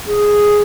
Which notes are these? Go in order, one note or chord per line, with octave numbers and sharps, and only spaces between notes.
G#4